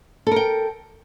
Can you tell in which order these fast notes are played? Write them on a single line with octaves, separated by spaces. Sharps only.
A4 A#4 G5